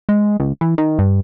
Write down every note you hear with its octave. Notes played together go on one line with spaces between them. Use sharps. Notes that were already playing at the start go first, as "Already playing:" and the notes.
G#3
C#2
E3
D#3
G2